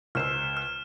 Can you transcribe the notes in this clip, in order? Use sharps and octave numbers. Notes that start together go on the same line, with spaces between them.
C#2 C5 E6 F6 E7
F6